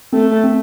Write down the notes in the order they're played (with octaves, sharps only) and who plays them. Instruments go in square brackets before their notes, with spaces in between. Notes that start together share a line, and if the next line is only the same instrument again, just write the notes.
[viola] A3 [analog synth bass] C4
[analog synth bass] C4